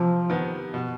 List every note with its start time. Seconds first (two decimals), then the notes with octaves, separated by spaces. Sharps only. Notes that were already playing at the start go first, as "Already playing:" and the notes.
Already playing: C3 F3
0.30 D#3 B3
0.74 B2